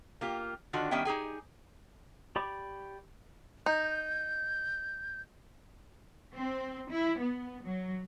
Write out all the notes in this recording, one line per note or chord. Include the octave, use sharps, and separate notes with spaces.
A#3 F4 G4
D3 D#3 D4 F4 F#4
D#3 G3 B3 C#4 E5 G5
D#4 G4 G#4 G#5
G4 D5 B5 C#6 D6
D#4 G6
C4
E4
B3
F#3